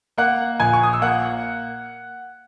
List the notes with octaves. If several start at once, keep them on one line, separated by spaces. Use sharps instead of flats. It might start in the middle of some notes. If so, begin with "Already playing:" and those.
A#3 F#5 F#6
A#1 G#5 G#6
C#6
D#6
E6
A#3 F#5 F#6